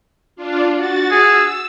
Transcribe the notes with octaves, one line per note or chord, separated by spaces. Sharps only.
D4 F4
F#4 A6
G#4 E6